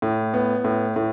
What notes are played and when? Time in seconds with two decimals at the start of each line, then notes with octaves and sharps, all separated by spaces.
0.02 A2
0.34 B3
0.64 A2
0.96 A2